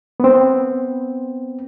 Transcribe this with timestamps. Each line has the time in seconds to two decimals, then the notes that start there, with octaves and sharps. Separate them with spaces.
0.20 B3 C4